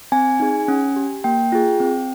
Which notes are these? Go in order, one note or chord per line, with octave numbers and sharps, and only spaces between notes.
C4 G#5
D#4 G#4
C#4
G4
A#3 G5
F4 G#4
C4